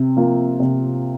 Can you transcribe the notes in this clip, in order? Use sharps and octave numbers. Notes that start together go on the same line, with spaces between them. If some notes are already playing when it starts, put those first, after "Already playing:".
Already playing: C3
F3 A#3 F4
C3